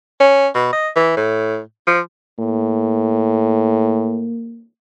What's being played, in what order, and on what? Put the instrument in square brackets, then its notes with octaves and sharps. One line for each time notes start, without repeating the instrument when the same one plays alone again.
[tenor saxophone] C#4
B2
D#5
E3
A2
F3
[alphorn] A2 [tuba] A#3